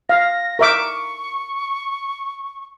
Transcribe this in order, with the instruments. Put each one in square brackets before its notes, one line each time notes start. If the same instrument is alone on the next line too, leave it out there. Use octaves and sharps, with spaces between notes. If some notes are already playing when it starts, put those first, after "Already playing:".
[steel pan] F5 [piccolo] A#6
[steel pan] A#4 E5 D6 [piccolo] C#6